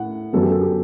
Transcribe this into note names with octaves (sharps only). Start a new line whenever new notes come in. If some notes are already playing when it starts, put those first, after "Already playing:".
Already playing: A2 F#5
G1 F#2 F#3 B3 A4
G4
A4
G4